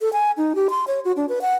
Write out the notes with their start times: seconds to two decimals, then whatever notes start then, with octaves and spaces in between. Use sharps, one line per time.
0.01 A4
0.13 G#5
0.37 D#4
0.55 G4
0.70 C6
0.87 C#5
1.05 F#4
1.16 D4
1.29 B4
1.42 F#5